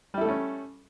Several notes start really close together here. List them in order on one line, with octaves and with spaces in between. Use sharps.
G3 E4 A4 A3 C#4